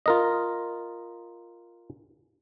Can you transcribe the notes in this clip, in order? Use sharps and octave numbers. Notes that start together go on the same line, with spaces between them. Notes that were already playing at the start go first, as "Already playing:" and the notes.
F4 A#4 D#5